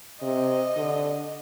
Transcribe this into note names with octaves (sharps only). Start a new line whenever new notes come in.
C3 D#5
D3